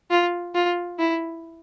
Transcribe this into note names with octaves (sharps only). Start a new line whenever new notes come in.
F4
F4
E4